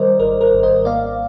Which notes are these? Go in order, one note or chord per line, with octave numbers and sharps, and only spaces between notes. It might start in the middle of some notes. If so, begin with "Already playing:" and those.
Already playing: D#3 G3 A#4 C5 D5 D#5
G#1 A#4
A#4
G#1
C5 D#5
A#3 D5 F5